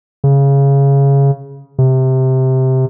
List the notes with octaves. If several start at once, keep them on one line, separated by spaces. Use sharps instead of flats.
C#3
C3